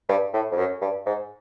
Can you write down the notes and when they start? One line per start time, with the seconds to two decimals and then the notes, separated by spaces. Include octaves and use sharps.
0.09 G2
0.33 A2
0.51 F2
0.57 F#2
0.81 G2
1.06 G#2